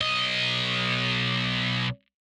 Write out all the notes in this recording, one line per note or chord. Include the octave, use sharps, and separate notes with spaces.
B1 D#5